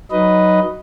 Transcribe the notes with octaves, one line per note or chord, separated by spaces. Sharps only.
F#3 D#4 B4 D#5